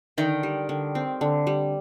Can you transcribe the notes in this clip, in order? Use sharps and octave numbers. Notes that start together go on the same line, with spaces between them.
D3 D#3
G3
D3
C4
D3
G3